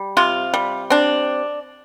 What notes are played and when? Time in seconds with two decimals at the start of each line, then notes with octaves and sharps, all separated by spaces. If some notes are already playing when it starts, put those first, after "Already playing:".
Already playing: G3
0.17 C3 F4
0.54 G3
0.90 C4 D4